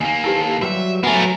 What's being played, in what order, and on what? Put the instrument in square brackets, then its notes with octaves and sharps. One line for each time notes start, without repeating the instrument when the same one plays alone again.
[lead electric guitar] D#2 A#3 [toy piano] G#5
[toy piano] E4 G4 B4 [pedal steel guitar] A4
[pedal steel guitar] F#3 G3 [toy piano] F#4 B4 G5 [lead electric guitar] E5
[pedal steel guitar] F#3 [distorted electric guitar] A3 B3 [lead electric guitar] A#4 [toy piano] F#5 G#5